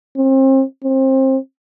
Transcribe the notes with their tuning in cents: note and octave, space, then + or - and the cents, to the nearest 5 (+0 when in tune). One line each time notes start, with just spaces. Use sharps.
C4 +35
C4 +25